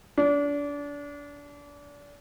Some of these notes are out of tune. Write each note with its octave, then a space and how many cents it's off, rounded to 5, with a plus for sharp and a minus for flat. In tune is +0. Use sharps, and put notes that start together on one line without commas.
D4 -30